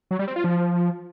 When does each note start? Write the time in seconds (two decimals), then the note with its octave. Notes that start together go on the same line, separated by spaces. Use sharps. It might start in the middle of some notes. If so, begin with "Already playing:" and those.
0.11 F#3
0.19 G3
0.28 C4
0.36 F4
0.44 F3